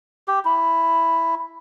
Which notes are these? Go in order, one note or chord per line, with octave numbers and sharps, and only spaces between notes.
G4
E4